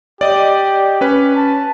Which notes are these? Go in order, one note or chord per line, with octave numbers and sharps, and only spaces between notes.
G4 D5 D#5
C#4 B4
A5